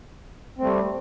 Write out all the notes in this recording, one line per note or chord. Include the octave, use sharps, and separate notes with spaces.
G3 A3 C4